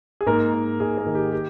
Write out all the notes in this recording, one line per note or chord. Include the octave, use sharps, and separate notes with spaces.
G#4
G#2 A#3 A#4
G#2
G#2 G#4
A#3 A#4
D#3
G4
G4